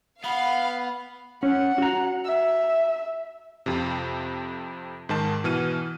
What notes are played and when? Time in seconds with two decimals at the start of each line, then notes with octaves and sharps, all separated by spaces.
0.24 B3 F5 F#5 B5
1.43 C#4 F#5
1.78 F#4 A#5
2.25 E5
3.66 F2 C3
5.09 G#2 D#3 A5
5.44 B2 E3 F6 D#7